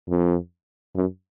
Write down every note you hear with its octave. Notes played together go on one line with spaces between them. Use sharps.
F2
F#2